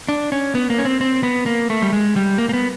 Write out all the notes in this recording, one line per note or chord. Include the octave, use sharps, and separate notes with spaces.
D4
C#4
B3
A#3
C#4
C4
C4
B3
A#3
A3
G3
G#3
G3
A#3
A#3
B3